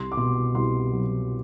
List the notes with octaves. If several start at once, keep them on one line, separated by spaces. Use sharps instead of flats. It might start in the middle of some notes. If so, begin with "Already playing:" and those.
Already playing: C2 C6
D6
B2 C6
C2 C6
F#3